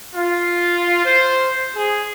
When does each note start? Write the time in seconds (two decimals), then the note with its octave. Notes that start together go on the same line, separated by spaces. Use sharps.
0.14 F4
1.05 C5
1.75 G#4